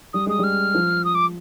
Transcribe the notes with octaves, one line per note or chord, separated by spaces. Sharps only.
G3 D#6
G#3 D#6
G3 F6
F3
D#6
D6